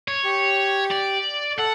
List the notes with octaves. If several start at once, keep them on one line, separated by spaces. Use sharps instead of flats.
C#5
G4
D5
A4 F#5